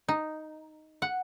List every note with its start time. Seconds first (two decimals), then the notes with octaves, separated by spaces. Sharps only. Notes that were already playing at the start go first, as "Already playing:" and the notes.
0.08 D#4
1.02 F#5